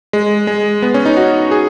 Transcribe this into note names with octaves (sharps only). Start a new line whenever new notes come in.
G#3
G#3
B3
C#4
D#4
F#4
G#4